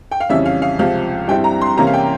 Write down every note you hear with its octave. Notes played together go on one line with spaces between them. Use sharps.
G5
F5
F2 C#3 E3 G3 C#4 E5
F5
F5
C#2 C3 F3 F5
G2 G3 C4 E4 G5
A#5
C6
C3 E3 A#3 C#4 E4 A#5
F5
G5